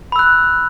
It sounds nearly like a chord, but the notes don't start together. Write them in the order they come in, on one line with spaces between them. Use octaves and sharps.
B5 E6 F#6